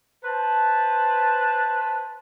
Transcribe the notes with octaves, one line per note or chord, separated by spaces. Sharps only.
B4 C5 A5